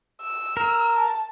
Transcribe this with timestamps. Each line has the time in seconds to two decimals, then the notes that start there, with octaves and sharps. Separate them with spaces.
0.21 E6
0.57 A#4
0.96 A5